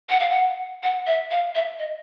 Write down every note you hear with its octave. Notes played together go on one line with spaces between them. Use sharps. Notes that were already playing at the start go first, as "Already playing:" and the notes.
F#5
F5
F#5
F#5
E5
F5
E5
D#5